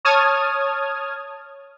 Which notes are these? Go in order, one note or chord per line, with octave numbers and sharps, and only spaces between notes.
C#5 A5 D#6 F6 G#6